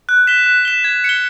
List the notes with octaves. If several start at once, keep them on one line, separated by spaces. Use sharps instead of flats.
F#6
B6 E7 G7
F#6
B6 E7 G7
G#6
C#7 E7 G7